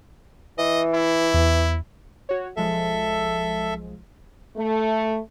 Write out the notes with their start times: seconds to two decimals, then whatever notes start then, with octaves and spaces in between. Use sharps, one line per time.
0.58 E3 D#5
0.94 E4
1.34 E2
2.29 F#4 C#5
2.57 B1 F3 G#3 A4 E5
4.56 A3